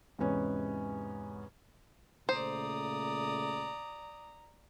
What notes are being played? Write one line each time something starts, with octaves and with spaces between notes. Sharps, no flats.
E2 G#2 C3 B3 C#4
A#2 C#3 A3 C5 D5 A#5 D#6